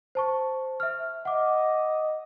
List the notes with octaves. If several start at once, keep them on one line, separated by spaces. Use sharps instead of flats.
C5 A5 C#6
E5 F6
D#5 F#5 D6